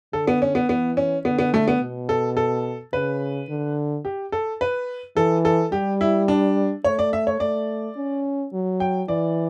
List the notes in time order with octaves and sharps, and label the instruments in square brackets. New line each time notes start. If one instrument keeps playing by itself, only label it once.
[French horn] D3 [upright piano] A4
[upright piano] B3
C#4
B3
[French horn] E3 [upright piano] B3
[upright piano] C#4
[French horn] D3 [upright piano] B3
[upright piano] B3
A3
B3
[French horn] B2
[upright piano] A4
A4
[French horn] C#3 [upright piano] B4
[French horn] D3
[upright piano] G4
A4
B4
[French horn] E3 [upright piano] A4
[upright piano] A4
[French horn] G3 [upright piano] G4
[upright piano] E4
D4
[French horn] A3 [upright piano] C#5
[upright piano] D5
E5
C#5
[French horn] A3 [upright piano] D5
[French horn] C#4
F#3
[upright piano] G5
[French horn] E3 [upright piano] D5